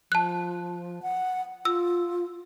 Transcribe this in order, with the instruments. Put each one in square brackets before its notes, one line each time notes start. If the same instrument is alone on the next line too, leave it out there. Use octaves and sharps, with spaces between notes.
[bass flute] F3 [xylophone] A5 F#6
[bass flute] F#5
[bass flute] F4 [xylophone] E6